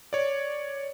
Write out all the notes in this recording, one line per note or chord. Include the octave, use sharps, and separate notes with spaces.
C#5 D5